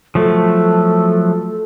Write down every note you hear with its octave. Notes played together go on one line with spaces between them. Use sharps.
F3 F#3 A3 A4